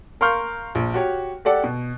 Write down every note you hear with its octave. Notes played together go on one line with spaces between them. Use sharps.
A#4 F5 C6 C#6 F6 G6
A#1
F#4 G4 C#5
G4 A4 D5 F#5
B2